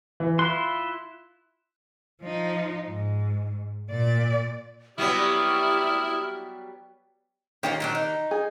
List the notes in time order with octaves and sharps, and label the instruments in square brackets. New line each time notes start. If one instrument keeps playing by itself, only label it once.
[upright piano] E3
[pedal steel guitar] E4 F4 C6 [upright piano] F#6
[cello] F3 D#4
G#2
A#2 D5
[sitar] F#3 G3 B3 [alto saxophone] E4 [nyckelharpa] G4 D5 [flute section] D#6 F6
[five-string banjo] D#3 G4 [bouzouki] A#3 F4 C#5
[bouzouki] A#2 F#3 D4
D#4
[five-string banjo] G#4